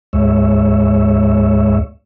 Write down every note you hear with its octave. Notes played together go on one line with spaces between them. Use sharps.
D2 G#2 G#3 C#5 E5